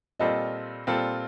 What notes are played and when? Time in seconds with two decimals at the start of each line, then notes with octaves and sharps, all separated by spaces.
0.20 A#2 G3 C4 F4 A4 D#5
0.87 A#2 G3 C4 F4 A4